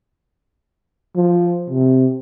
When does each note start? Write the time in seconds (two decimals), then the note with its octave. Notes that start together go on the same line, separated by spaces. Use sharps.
1.16 F3
1.70 C3